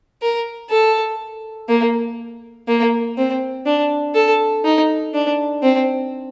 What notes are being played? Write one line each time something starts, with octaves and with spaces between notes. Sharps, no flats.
A#4
A4
A#3
A#3
C4
D4
A4
D#4
D4
C4